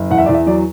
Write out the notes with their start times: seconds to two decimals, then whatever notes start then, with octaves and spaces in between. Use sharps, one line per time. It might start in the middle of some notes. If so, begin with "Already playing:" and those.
Already playing: F#1
0.11 E2 F#5
0.18 E5
0.26 D5
0.29 E2
0.34 E5
0.47 F#3 D5